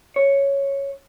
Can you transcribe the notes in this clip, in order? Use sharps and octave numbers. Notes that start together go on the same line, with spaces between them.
C#5